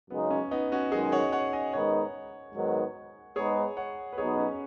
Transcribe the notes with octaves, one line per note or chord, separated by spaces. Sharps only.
F#2 C#3 G#3 B3 D#4
C#4
B3 D#4
C#4 F#4
F#2 D#3 G#3 D#4 G#4
C#5 F#5
C#5 F#5
D#5 G#5
G#2 D#3 B3 D#4 C#5 F#5
G#2 D#3 F#3 B3
G#2 G#3 B3 D#4 G#4 C#5
C#5 F#5
B4
B1 B2 B3 D#4 G#4 C#5
C#4